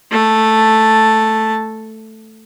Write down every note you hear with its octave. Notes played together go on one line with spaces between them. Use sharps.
A3 A5